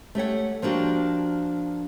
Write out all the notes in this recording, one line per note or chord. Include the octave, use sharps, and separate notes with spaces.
A3 G4 C#5 F#5
F3 A#3 D4 F#4 G4